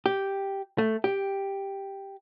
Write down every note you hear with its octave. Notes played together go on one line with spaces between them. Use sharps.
G4
A3
G4